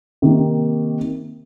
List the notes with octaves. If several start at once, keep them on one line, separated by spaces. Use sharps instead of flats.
C3 D#3 A#3